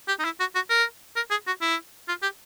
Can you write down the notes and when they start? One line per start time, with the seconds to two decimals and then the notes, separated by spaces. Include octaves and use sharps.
0.08 G4
0.19 D#4
0.25 E4
0.40 F#4
0.55 F#4
0.70 A#4
1.16 A#4
1.30 G#4
1.47 F#4
1.61 E4
2.08 F4
2.22 G4